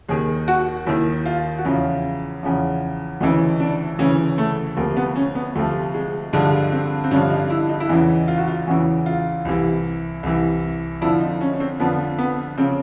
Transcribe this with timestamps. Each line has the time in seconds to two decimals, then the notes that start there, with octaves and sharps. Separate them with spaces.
0.09 D#2 D#3 G#4
0.48 F#4
0.86 D#2 D#3 E4
1.26 F4
1.58 F#4
1.65 E2 C#3 F3 F4
2.43 E2 C#3 F3
3.21 D2 C#3 E3 D#4
3.60 D4
3.98 D2 C#3 E3 C#4
4.38 A3
4.77 D2 C3 F3 A#3
4.97 B3
5.16 C#4
5.35 B3
5.55 D2 C3 F3 A3
5.94 G#3
6.33 G2 D3 F3 G#3
6.72 C4
7.04 C4
7.11 G2 D3 F3 C#4
7.30 D#4
7.50 E4
7.69 D#4
7.80 E4
7.89 E2 C#3 E3 D#4
8.28 F4
8.38 F#4
8.48 F4
8.67 E2 C#3 E3 F#4
9.06 F4
9.45 C2 C3 E3
10.23 C2 C3 E3
11.01 F2 D3 F3 E4
11.20 D#4
11.41 C#4
11.54 C#4
11.60 C4
11.80 F2 D3 F3 B3
12.18 B3
12.58 C#3 F3 C4